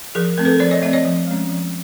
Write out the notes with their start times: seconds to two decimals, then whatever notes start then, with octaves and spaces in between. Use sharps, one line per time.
0.15 F3 G#4 A#4
0.38 A3 C4 A#4
0.45 A4 B4
0.60 F3 C5 D5
0.71 C#5 D#5
0.82 A3 C4 D5 E5
0.93 C#5 D#5
1.05 F3
1.27 G#3 C#4
1.50 F3